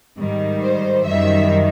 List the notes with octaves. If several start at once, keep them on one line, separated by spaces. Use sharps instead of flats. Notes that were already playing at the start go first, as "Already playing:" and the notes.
G#2 D#3 G3
C5
F#2 D#3 G3 E5